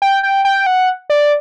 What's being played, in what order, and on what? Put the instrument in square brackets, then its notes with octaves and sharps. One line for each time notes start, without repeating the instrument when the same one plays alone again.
[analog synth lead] G5
G5
G5
F#5
D5